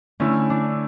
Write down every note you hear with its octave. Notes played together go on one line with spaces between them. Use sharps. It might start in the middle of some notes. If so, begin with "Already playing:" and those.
D3 A3 C#4 E4
D4